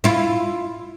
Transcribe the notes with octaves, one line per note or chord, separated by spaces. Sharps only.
E4 F4